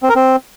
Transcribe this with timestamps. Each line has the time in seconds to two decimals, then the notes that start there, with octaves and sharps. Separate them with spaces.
0.03 C4
0.09 A#4
0.15 C4